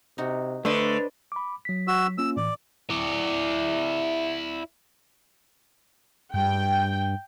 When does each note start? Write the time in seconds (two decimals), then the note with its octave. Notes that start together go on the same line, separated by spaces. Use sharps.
0.18 C3 D#4 F#4
0.65 D3 A3 D4 B4 C5 D#5
1.32 B5 D6
1.65 F#3 B6
1.88 F#4 E6
2.18 A#3 C#4 F4 E6
2.37 A2 E3 D5
2.90 E4 D5
6.34 G2 G5